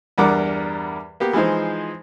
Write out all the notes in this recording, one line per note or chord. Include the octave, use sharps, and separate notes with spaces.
E2 G2 G3 A#4 F#5 D6
A#3 B3 G4
E3 F3 G#3 D#4 C5